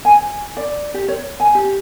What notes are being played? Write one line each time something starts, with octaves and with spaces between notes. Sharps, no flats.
G#5
D5
G4
C#5
G#5
G4